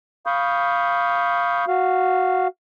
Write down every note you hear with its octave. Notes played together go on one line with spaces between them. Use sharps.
F5 B5 C#6 D#6 G6
F#4 F5